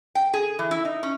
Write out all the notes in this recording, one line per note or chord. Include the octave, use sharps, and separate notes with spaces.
G5
G#4
E3
E4
D#4
C#4